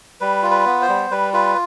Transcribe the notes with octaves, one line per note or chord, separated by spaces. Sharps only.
G3 B4
F4
B4
B3
C5
G3
G3 B4
F4 B4